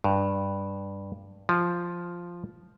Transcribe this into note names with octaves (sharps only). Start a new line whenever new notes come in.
G2
F3